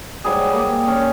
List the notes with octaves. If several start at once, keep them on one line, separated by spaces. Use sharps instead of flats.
G#2 F#3 G3 G#4
G3 A#3
C#4